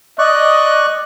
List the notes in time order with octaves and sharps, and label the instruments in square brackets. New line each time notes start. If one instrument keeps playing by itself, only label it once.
[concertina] D5 C#6 F#6 [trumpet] D#5